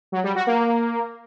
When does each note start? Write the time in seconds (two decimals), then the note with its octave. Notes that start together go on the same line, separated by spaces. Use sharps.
0.12 F#3
0.24 G3
0.35 F#4
0.47 A#3